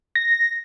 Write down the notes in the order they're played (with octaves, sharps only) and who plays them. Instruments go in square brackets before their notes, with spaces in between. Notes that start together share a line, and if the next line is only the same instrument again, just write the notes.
[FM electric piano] A#6